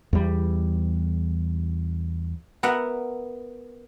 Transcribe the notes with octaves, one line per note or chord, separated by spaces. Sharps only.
E2 G3
B3 A#4 E5 F#5